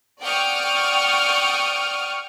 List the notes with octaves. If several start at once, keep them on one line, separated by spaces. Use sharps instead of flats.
D5 F#5 G5 C#6 D#6 F6